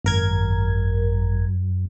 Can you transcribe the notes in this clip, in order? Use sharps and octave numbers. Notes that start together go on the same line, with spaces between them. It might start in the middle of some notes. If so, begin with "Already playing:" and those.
G#1 F#2 A#4 G#6